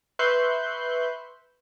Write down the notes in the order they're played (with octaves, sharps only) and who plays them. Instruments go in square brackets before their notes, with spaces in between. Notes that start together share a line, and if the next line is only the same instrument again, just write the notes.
[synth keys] B4 E5 C6 C#6 F#6 G6